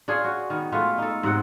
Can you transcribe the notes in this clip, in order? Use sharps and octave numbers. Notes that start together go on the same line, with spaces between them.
D4 F4 G#4 C#5
F#4
D#3 B3
G#3 A3 F4 B4
D#4 A4
G#2 C3 F#5 G5